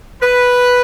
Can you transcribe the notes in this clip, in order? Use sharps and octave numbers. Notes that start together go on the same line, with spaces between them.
B4